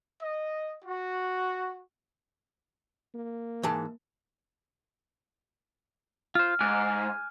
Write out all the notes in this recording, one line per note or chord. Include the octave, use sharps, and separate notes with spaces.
D#5
F#4
A#3
G#2 E3 A5
F4 C5 F6
G#2 G#5 D6 F#6